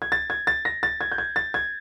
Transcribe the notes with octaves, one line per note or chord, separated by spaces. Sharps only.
G#6
A6
G#6
A6
A#6
A6
G#6
G6
G#6
A6
G#6